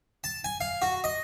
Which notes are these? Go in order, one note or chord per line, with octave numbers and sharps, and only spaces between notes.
A5
G#5
F5
F#4
D#5